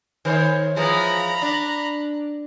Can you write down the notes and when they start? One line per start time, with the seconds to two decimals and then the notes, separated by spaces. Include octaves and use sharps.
0.25 D#3 C5 C#5
0.76 E3 F3 G#3 A#5 B5
1.42 D4